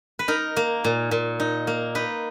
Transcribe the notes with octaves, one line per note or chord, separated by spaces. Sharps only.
B4
D#4 A#4
A#3
A#2
A#2
D#4
A#3
D#4 B4